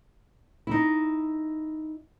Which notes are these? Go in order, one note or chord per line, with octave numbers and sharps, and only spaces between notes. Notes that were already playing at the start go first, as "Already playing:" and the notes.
D#4 E4